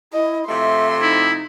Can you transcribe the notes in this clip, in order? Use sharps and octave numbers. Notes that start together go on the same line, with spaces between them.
E4 D#5
C3 F3 A3 E5 C6
D#4 E4